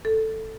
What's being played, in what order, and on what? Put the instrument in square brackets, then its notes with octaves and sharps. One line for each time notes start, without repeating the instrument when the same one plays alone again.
[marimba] A4